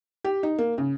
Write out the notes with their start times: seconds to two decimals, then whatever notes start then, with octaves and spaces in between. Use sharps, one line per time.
0.24 G4
0.43 D#4
0.58 A#3
0.78 C#3